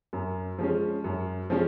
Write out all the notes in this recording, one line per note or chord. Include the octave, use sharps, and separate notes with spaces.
F#2
F3 G#3 C#4
F#2
F3 G#3 C#4